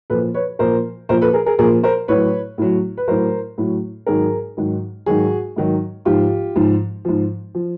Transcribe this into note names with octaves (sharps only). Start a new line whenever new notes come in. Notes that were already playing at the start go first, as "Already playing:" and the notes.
A#2 F3 A4 B4
B4 C#5
A#2 F3 A#4 C5
A#2 F3 A#4 C5
A4 B4
G#4 A#4
G#4 A#4
A#2 F3 G#4 A#4
A#4 C5
A2 F#3 B4 C#5
A2 F#3
B4
A2 F#3 A#4 C5
A2 F#3
G#2 D#3 F#3 G#4 A#4
G#2 D#3 F#3
G#2 D#3 F#3 F#4 G#4
G#2 D#3 F#3
G#2 F3 F4 G4
G#2 F3
G#2 F3
F3